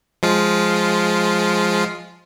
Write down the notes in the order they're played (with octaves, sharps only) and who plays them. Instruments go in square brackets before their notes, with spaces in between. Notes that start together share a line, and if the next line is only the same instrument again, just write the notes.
[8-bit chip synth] F3 G#3 F4